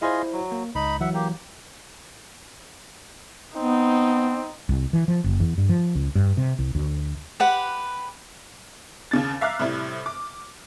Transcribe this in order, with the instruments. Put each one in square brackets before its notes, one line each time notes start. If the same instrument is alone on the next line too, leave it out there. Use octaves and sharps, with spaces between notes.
[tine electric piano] E4 C5 D5 [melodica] F4 G#4 D#5
[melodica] F#3
[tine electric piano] A#3
[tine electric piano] C#2 [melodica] D#4 B5
[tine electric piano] E3 F#3 [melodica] E5 F#5
[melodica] A#3 G4
[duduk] B3 [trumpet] C4 [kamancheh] D#4
[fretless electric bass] C2
E3
F3
F#1
E2
G2
F3
C#2
G2
C3
C2
D2
[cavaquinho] G4 B4 F#5
[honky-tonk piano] D#2 C#3 A6
E5 F5 A#5 D6 F6 F#6
A2 C3 G3 E4
D6